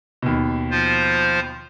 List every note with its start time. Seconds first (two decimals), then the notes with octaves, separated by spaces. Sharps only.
0.22 D#2 B2
0.71 F3 F4 C5